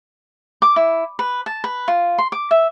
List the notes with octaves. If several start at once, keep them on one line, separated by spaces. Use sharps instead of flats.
D6
E4
B4
A5
B4
F4
C6
D6
E5